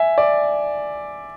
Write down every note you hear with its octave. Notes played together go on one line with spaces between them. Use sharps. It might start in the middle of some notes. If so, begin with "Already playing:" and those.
Already playing: E5 G#5
D5